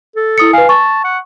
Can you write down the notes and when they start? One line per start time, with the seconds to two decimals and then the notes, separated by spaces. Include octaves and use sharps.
0.16 A4
0.38 E4 D#6 C#7
0.53 B4 F5 G#5
0.69 A5 C#6
1.05 F#5